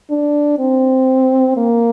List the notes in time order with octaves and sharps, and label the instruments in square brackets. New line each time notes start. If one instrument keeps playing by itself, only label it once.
[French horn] D4
C4
A#3